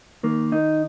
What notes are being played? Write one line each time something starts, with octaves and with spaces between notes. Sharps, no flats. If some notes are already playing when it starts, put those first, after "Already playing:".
D#3 A#3
D#4